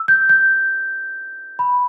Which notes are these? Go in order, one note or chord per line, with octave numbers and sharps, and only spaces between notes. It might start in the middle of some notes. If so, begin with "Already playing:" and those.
Already playing: E6
G6
G6
B5